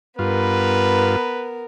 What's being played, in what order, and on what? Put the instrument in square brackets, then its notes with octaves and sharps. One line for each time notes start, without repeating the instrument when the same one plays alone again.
[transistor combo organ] G2 F4 [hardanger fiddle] B3 A#4 [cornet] B4